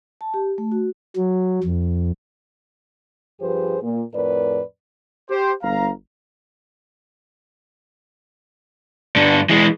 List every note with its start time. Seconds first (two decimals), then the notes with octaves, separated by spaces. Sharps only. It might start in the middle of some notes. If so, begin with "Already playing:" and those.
0.21 A5
0.34 G4
0.58 A3
0.72 F#4
1.16 F#3
1.64 F2
3.41 G2 F3 G4 G#4 B4 C5
3.83 A#2
4.14 F2 A2 A#4 B4 D5
5.29 G4 C5
5.62 G1 F5 A#5
9.16 G2 D3
9.50 E3 G#3